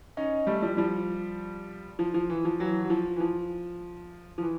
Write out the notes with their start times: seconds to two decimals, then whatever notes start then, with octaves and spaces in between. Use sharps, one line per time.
0.17 C#4 D#4
0.47 G3 A3
0.62 F3 G3
0.77 F3 G3
1.99 F3
2.14 F3
2.30 E3
2.45 F3
2.60 E3 F#3
2.84 F#3
2.90 F3
3.16 E3
3.20 F3
4.38 F3
4.42 E3